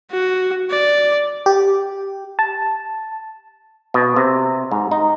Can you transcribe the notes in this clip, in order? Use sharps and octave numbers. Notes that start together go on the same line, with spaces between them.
F#4
D5
G4
A5
B2
C3
G#2
D#4